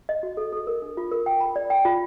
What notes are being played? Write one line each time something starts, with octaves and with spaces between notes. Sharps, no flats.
D#5
F#4
A4
A4
A#4
D4
F4
A#4
G5
B5
D5
G5
F4